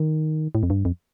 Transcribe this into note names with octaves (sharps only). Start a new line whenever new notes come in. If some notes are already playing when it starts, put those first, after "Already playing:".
Already playing: D#3
A2
F2
G2
F2